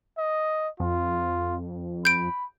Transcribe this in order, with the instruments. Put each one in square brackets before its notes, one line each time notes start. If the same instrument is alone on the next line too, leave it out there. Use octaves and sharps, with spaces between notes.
[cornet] D#5
[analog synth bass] F2 [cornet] F4
[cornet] B5 [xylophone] G6 D7